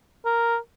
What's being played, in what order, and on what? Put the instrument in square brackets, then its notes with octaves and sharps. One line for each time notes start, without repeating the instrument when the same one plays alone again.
[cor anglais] A#4